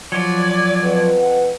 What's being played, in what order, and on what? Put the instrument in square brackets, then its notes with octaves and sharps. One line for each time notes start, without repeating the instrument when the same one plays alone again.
[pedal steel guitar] F3 F#3 [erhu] D5 [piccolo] G#6
[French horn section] F2 B3 B4
[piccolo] F#5